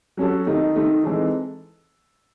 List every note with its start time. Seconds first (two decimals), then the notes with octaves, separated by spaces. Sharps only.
0.17 F#3 C#4 F#4 A4
0.47 D#3 A3 D#4
0.75 D#3 A3 D#4
1.04 E3 G#3 C4 D#4 A4